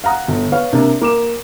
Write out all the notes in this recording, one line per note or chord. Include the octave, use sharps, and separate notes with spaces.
F5 F#5 A#5 D#6
G1
B4 C#5 F5
C3 A#3 D4
A#3 D6 E7